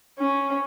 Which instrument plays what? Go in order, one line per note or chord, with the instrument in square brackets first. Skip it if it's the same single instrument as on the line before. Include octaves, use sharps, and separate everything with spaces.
[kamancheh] C#4